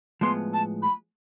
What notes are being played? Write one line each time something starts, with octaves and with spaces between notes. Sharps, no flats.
A2 F3 G#3 B3 C6
A5
B5